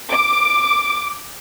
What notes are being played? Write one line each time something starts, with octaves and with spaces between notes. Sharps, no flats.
D6